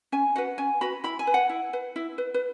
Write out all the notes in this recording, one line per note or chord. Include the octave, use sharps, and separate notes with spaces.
C#4 G#5
F#4 B4 F#5
C#4 G#5
F#4 B4 B5
E4 B5
G#5
B4
F#5
E4
B4
E4
B4
B4